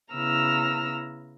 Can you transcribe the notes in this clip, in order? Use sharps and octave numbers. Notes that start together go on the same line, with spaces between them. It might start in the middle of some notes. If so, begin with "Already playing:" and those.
C#3 B3 E4 A#5 E6 F6